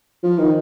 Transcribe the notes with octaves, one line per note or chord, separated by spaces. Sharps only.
F3
D#3